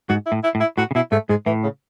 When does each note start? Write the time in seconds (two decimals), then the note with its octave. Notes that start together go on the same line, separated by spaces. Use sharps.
0.09 G#2 F#4
0.26 E4
0.32 A2
0.44 E4
0.55 A2
0.61 E4
0.78 A2 F#4
0.91 C#3
0.95 B2 E4
1.12 G#2 A3
1.29 G#2 G#3
1.46 A2 E3
1.63 C#3